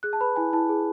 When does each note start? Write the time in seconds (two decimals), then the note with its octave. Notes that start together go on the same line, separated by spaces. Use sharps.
0.03 G#4 F#6
0.13 A5
0.21 B4 B5
0.36 E4 G#5
0.53 E4 A5
0.69 G#4